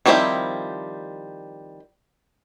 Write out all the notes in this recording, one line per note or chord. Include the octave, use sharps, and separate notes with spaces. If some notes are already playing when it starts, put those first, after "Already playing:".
D#3 F3 G3 C4 E4